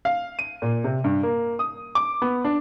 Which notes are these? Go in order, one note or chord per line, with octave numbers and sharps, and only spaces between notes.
F5
D#7
A#2
C3
G2
A#3
D#6
D6
B3
D4